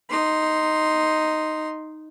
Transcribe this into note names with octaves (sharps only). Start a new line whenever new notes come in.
D#4 C6